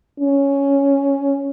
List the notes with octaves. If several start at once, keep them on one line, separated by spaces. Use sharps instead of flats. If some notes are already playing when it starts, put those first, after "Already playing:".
C#4